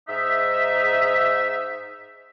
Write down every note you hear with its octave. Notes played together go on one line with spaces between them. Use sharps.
G#2 D#4 E5